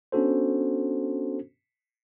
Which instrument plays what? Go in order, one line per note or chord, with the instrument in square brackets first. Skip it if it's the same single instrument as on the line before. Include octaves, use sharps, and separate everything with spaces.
[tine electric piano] B3 C#4 D4 F#4 A4 C5